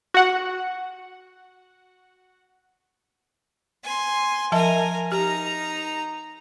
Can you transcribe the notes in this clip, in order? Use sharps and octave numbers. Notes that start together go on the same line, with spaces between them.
F#4 F#5
G#5 C6
F3 A#4 E5 G#5 A5
D#4 G4 A#5